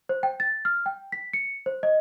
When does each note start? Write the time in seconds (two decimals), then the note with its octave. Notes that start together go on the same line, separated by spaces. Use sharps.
0.09 C5
0.23 G5
0.40 A6
0.65 F6
0.86 G5
1.12 B6
1.33 C#7
1.66 C5
1.83 D#5